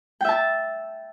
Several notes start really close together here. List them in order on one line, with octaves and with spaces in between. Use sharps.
G5 E5 A5